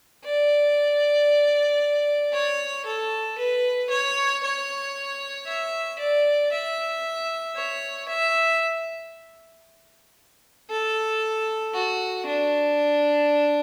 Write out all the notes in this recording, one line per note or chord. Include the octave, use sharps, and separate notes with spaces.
D5
C#5
A4
B4
C#5
C#5
E5
D5
E5
C#5
E5
A4
F#4
D4